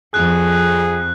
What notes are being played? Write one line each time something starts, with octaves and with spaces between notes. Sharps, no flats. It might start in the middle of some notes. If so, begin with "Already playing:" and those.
F2 G#4 F#6